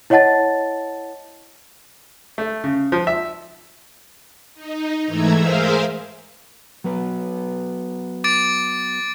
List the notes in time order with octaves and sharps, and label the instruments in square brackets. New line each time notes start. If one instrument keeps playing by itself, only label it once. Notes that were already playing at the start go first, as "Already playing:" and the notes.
[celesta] E4 C#5 D#5 F#5 A5 A6
[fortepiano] A3
C#3
F3
E5
[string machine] D#4
G#2 E3 A3 E5 A#5 G#6
G#4 A#4 C5 E5 F5
[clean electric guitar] F#3 B3 B4
[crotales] D6 A6 D7